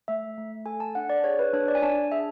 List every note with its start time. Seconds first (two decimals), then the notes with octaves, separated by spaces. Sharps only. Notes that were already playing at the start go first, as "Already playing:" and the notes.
0.08 A3 E5
0.38 A3
0.66 A4 G#5
0.80 A5
0.95 D4 F#5
1.10 D5
1.24 G#4 C#5
1.39 B4
1.53 D4 C#5
1.68 D5
1.75 G#5
1.82 D4 A5
2.12 G#4 E5